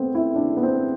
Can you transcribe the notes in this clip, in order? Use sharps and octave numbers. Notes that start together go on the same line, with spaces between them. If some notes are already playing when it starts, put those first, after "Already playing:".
Already playing: A3 B3 C4
E4
D4
B3
C4